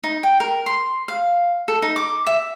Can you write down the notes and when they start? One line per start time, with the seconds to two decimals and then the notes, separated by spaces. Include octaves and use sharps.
0.04 D#4
0.23 G5
0.40 A#4
0.66 C6
1.08 F5
1.68 A4
1.82 D#4
1.96 D6
2.27 E5